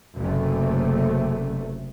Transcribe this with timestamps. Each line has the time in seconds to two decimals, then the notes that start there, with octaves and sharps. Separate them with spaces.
0.17 F#1 C3 A3